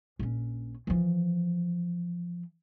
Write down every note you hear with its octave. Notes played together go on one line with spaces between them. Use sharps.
A#1 C#4
E3 F3